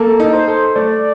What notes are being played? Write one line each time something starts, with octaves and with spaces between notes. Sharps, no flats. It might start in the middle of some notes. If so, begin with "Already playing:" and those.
Already playing: A#3 A4
D#4
C5
A4
A3 D5